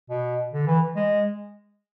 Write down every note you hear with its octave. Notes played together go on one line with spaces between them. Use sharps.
B2
D3
E3
G#3